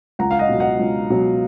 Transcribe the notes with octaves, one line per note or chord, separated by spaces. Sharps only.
C#2 F#5 A#5
F5
D#5 F#5
B2 F#3
D#5 F#5
C#2
B2 F#3